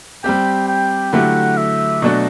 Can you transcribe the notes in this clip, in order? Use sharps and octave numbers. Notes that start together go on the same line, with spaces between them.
G3 C4 G4 G5
G5
D3 F#3 A3 E4 G4 F#5
E5
B2 F#3 A3 D4 F#4